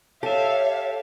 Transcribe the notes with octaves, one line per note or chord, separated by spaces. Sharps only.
G4 A4 C#5 E5 F5